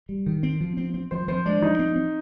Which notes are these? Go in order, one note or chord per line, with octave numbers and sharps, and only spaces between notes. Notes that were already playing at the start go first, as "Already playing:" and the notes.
G3
D#3
C4
F3
C4
C4
F3 C5
F3 C5
G#3 D4
F3 D#4
C4
C4